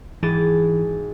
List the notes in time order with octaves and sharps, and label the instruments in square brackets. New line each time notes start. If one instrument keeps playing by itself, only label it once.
[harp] G#1 G#4 A6 [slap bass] E3